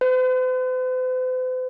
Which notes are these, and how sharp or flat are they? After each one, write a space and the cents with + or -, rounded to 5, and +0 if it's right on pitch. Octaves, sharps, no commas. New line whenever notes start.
C5 -45